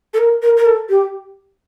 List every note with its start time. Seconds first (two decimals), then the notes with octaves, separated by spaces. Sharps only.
0.14 A4
0.18 A#4
0.42 A#4
0.57 A#4
0.66 A4
0.89 G4